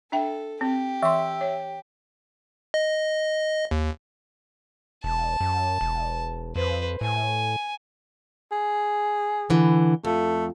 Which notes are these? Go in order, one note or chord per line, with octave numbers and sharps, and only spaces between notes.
D4 A4 E5 G5
C4 G4
E3 E5 C6
C#5
D#5
D#2
E1 A5
F#2
E1
F2 B4 C5
A2 G#5
G#4
D3 E3
F2 A3